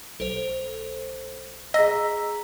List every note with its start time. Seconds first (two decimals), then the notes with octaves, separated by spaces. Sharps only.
0.20 B1 A4 C5
1.74 G#4 D#5 A#5 E6 B6